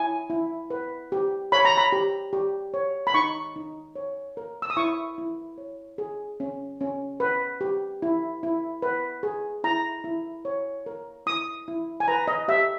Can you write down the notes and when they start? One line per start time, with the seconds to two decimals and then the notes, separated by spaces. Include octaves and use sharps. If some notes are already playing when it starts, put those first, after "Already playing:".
Already playing: E4 G#5
0.30 E4
0.70 B4
1.12 G4
1.52 C#5 B5
1.65 A#5
1.77 B5
1.92 G4
2.33 G4
2.74 C#5
3.07 B5
3.14 D#4 C#6
3.56 D#4
3.96 C#5
4.37 A#4
4.62 E6
4.70 D#6
4.77 E4 C#6
5.18 E4
5.58 C#5
5.98 G#4
6.40 C#4
6.81 C#4
7.20 B4
7.61 G4
8.02 E4
8.43 E4
8.82 B4
9.23 G#4
9.64 E4 A#5
10.04 E4
10.45 C#5
10.86 A#4
11.26 E4 D#6
11.68 E4
12.00 G#5
12.08 B4 A#5
12.28 D#5
12.48 G4 E5